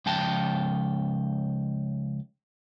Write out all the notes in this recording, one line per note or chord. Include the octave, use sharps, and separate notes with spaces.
C#2 F3 G5 A5